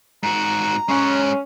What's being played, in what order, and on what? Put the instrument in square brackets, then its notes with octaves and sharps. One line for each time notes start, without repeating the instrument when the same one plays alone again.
[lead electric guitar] G#2 F#4 [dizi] A#5
[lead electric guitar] G#3 F#5 [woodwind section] C#4